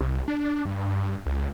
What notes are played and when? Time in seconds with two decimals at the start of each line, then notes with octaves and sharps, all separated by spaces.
0.01 C2
0.28 D4
0.65 G2
1.26 C#2